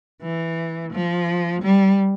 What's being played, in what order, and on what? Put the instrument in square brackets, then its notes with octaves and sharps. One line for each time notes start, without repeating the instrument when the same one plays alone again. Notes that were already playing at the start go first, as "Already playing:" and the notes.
[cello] E3
F3
G3